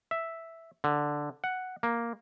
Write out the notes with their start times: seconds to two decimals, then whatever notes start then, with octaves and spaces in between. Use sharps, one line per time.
0.11 E5
0.84 D3
1.44 F#5
1.83 A#3